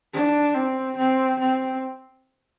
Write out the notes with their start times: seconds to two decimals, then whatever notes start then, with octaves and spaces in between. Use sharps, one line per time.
0.13 D4
0.55 C4
0.97 C4
1.39 C4